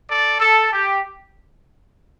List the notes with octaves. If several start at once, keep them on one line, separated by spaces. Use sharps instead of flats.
A4 D5
A4
G4